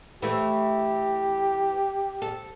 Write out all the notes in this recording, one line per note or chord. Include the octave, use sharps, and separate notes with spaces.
E3 A3 G4
A4